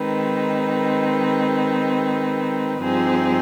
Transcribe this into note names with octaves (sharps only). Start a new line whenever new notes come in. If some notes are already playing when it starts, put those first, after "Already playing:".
Already playing: D#3 G#3 C4 D#4 B4
G2 F3 C4 D#4 G#4